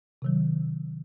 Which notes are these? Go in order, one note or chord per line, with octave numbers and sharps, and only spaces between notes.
C3 D#3 F#3